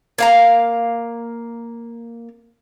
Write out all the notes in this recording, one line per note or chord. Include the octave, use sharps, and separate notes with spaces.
A#3 F5 A#5